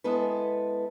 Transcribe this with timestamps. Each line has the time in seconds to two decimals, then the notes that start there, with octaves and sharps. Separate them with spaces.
0.04 G#3 B3 E4 A4 B4